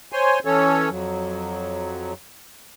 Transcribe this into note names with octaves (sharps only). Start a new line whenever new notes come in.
C5 C#5 G#5 C6
E3 C#4 A4 C#5
F2 F#3